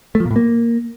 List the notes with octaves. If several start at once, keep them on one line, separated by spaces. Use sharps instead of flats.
A3
F3
A#2
A2
A#3